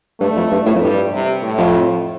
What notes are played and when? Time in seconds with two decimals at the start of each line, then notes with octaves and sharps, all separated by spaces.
0.20 G2 A3
0.36 F2
0.51 G2
0.66 A2
0.75 F2
0.81 G2 G3
1.12 C3
1.42 A2
1.58 F2